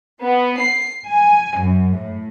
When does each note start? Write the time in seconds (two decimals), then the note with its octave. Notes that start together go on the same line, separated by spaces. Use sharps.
0.23 B3
0.61 C7
1.06 G#5
1.57 F#2
1.96 A2